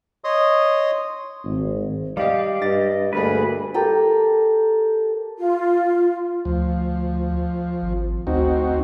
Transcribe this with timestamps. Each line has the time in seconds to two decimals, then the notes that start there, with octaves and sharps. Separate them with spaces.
0.24 C#5 D#5 C6 D#6
1.45 G#1
2.17 G3 G4 D5 D#5 F5
2.62 G2 D#5 A6
3.13 D2 G2 A#3 G#4 B4 B5
3.74 G4 A4 A#4 G5
5.39 F4
6.45 D2 F3
7.82 G#1
8.27 D2 C4 D#4 F#4